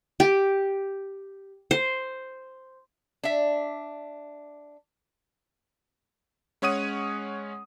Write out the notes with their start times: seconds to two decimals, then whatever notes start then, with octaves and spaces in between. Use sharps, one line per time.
0.20 G4
1.71 C5
3.23 D4 E5
6.62 G#3 C#4 C#5 F#5 D#6 D#7